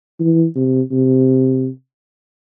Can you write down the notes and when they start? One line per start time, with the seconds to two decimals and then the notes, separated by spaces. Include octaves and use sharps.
0.20 E3
0.56 C3
0.92 C3